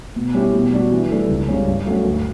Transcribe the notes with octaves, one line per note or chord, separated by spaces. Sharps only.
B2
G3 C#4 E4 G4
B2
G3 D4 F#4
E3
G3 D4 A4
C#2
C#3 G3 C#4
G2
F#3 A3 C#4
D2